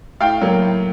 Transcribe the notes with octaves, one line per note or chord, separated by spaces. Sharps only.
A2 F5 G5
F#3 A#3
A2